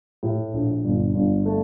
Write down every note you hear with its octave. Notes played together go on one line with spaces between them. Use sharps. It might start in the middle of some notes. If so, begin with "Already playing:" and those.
A2
A#1
G1
G1
A3